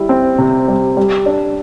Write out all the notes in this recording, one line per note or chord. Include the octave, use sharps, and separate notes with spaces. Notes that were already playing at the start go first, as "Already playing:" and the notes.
Already playing: G3 E4
C4
C3
G3
G3
D4